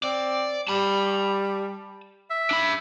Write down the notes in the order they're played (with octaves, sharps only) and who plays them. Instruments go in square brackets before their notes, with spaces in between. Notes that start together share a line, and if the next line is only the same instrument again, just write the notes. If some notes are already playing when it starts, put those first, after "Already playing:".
[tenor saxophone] C4 [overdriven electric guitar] D5
[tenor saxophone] G3 [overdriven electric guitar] A5 B5
[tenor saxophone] E5
[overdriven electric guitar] D4 B5